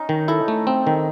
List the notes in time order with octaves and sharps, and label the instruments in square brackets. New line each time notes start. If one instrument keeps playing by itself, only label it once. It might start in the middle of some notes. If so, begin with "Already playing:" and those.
Already playing: [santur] C#4 D#4
[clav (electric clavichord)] D#3
[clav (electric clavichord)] E4 [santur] A4
[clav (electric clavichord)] A3
C4
D#3